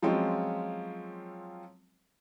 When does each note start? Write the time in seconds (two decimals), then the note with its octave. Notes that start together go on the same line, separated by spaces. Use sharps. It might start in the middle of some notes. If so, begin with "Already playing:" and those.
0.02 F3 F#3 G#3 C4 C#4 F4